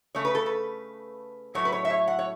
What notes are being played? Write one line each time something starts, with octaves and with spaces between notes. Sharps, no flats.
C#3 A3 C#5
B4
A4
B4
A2 F#3 A3 C#5
B4
C#5
E5
C#5
F#5
C#5